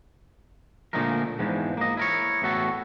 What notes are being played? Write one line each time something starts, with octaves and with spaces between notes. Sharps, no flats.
A#2 D3 F3 G#3 A3 A#4
E2 G#2 E3 F3
A#3 D#5
E4 A#4 C#5
E2 A2 F#4 A4